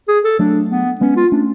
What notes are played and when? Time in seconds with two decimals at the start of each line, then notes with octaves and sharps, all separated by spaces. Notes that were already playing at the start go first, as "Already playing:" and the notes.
0.08 G#4
0.24 A4
0.39 F#3 A3 D4
0.70 B3
1.01 G#3 B3 C#4
1.16 F4
1.32 A3 C#4 D4